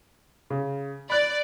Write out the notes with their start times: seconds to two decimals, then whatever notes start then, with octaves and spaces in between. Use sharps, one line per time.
0.50 C#3
1.10 D5 B5 F#6